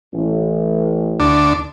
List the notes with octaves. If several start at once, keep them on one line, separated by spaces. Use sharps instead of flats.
A1
D2 D4